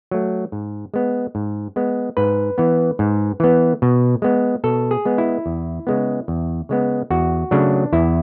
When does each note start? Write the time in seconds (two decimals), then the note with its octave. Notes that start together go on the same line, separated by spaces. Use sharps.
0.11 F#3 A3
0.52 G#2
0.94 G#3 B3
1.35 G#2
1.76 G#3 B3
2.17 G#2 B4
2.58 E3 B3
2.99 G#2
3.40 E3 B3
3.82 B2
4.22 G#3 B3
4.64 B2 A4
4.91 G#4
5.05 G#3 B3
5.18 E4
5.46 E2
5.87 C#3 G#3 B3
6.28 E2
6.69 C#3 G#3 B3
7.10 E2 F#4
7.51 C#3 F#3 A3 D4
7.93 E2 E4